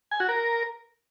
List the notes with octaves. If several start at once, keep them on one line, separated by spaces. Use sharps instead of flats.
G#5
F#4
A#4